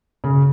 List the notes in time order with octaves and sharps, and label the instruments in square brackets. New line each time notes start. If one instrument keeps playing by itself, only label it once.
[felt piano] C#3